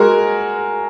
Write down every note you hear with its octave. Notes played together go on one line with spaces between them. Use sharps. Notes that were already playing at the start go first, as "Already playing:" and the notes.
Already playing: G#3 F#4 A#4